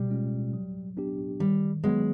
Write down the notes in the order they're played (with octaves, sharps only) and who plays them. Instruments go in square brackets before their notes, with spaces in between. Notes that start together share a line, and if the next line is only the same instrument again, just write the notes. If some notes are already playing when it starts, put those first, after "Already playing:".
Already playing: [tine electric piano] B2 [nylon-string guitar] G3
[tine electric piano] G#3 C#4 F4
F#3
B3 D4 G4
[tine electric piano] D#3 [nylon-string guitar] G3
[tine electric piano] F#3 B3 [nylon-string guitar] G#3